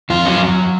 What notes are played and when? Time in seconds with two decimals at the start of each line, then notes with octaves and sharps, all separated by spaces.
0.10 F2 F4
0.26 F#3 C#4